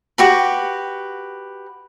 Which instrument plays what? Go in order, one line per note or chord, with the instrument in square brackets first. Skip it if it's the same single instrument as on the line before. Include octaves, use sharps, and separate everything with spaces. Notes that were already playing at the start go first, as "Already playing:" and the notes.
[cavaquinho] F#4 G4 B4